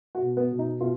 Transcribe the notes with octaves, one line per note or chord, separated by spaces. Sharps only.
F#4
B2
B3
B2
D#4
B2 F4